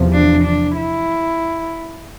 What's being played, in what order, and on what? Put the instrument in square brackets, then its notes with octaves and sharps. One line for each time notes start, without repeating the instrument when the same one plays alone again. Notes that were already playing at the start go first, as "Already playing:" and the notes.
Already playing: [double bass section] E2 C3 F3
[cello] D4
D4
E4